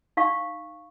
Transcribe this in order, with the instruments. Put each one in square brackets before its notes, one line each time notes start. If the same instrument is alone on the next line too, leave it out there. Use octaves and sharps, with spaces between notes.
[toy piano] D#4 F5 C#6